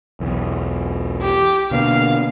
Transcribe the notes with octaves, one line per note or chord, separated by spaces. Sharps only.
B1 E2
G4
B2 D3 A#3 F5